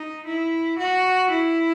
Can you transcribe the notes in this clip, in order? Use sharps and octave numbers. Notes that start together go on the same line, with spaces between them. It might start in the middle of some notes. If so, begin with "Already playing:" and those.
Already playing: D#4
E4
F#4
E4